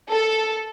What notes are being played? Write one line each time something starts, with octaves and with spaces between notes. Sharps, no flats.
A4